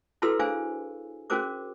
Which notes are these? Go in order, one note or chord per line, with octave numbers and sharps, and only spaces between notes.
E4 F#4 A4 B4 C6 E6
D4 G#4 C5 F5 G#5
C#4 F#4 G#4 A#4 C5 D6